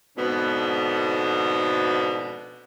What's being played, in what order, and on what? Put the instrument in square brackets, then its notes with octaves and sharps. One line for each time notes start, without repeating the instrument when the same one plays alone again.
[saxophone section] F2 G#2 B2 D3 B3